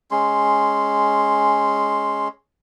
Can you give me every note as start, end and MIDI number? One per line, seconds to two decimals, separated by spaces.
0.11 2.28 56
0.11 2.28 61
0.11 2.28 84